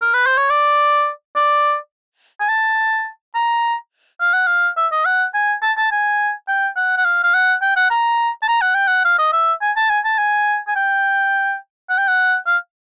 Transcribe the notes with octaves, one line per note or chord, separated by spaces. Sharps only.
A#4
B4
C5
C#5
D5
D5
G#5
A5
A#5
F5
F#5
F5
E5
D#5
F#5
G#5
A5
A5
G#5
G5
F#5
F#5
F5
F5
F#5
G5
F#5
A#5
A5
A#5
F#5
G5
F#5
F5
D#5
E5
G#5
A5
G#5
A5
G#5
G#5
G5
F#5
G5
F#5
F5